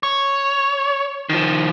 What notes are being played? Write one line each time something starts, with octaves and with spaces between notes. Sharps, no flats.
C#5
D#3 F3